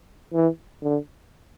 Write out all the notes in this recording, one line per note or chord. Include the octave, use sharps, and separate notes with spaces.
E3
D3